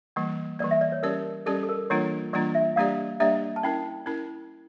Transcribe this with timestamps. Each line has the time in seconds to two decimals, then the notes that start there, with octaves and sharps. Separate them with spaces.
0.16 E3 G3 A#3
0.59 E3 G3 A#3 D5
0.71 E5
0.81 D5
0.92 C#5
1.03 G3 C#4 G4 A#4 D5
1.46 G3 C#4 G4 A4 D5
1.63 A4
1.69 A#4
1.90 E3 G3 A#3 D4 F4 C#5
2.33 E3 G3 A#3 D4 F4 D5
2.55 E5
2.76 G3 A#3 D4 G4 D5 F5
3.20 G3 A#3 D4 G4 D5 E5
3.56 A5
3.63 C#4 E4 A#4 G5
4.06 C#4 E4 A#4